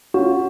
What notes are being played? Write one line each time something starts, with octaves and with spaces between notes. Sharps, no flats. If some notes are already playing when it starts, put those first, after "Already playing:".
C#4 F4 F#4